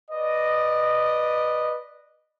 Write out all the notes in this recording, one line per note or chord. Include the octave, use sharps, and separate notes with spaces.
B4 D5 D#5